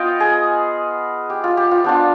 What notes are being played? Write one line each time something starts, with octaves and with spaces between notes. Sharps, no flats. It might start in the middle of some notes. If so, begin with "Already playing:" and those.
Already playing: B3 F4 D#5 F5 G5
G#4
G4
F4
G4
F4
B3 D4 F4 G4